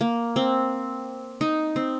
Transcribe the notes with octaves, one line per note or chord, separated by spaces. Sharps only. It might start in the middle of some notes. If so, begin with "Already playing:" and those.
A#3
C4
D#4
C4